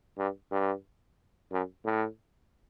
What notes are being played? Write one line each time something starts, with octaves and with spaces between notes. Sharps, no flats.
G2
G2
F#2
A2